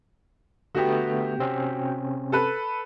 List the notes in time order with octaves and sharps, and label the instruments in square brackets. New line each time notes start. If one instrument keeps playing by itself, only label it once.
[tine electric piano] D3 A3 B3 [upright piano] F#4 G4
[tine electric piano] C3 C4 C#4
[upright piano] A4 B4